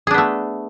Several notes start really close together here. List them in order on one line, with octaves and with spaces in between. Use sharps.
G#4 D4 B3 A3